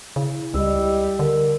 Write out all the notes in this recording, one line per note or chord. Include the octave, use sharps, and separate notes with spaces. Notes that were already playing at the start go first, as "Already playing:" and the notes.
C#3 E4
C#2 G3 D#5 E6
D3 A#4